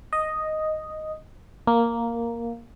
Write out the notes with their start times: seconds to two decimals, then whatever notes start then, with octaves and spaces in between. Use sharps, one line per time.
0.13 D#5
1.67 A#3